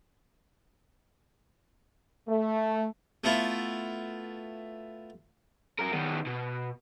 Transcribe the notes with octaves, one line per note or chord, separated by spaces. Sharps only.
A3
A3 B3 E4 F4
F#4 A#4
D#3 B3
B2